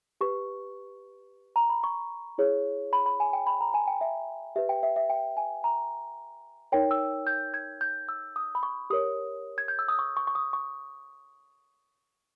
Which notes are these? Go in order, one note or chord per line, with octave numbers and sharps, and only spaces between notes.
G4 B4 C#6
A#5
B5
C#6
E4 G#4 C#5
B5
B5
G#5
G5
B5
A#5
G#5
G5
E5
G4 B4 E5
G5
E5
E5
G5
G#5
A#5
D#4 A#4 C#5 G5
E6
G6
G#6
G6
E6
D#6
B5
C#6
G4 A#4 C#5 D#6
G#6
G6
E6
D#6
C#6
C#6
C#6
D#6
C#6